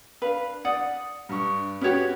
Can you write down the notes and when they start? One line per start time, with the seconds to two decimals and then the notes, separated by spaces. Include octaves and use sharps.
0.22 D4 B4 F5
0.65 D5 F#5 D#6
1.29 G2 C#6
1.81 B3 C#4 F#4 G4 C#5